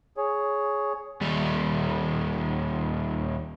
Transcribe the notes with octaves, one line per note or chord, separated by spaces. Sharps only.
G#4 C#5
D#2 G3